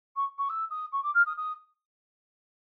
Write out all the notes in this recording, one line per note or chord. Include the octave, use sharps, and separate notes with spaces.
C#6
C#6
E6
D#6
C#6
D6
F6
D#6
D#6